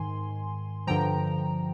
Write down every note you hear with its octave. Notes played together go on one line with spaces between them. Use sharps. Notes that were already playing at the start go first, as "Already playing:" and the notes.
Already playing: G#2 D#3 G#5 C6
G2 D3 F3 G5 A#5